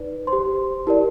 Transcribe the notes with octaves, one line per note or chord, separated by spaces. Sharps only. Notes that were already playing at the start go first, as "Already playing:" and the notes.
Already playing: D#4 B4 D5
C5 C6
G4
E4 G4 A#4 D5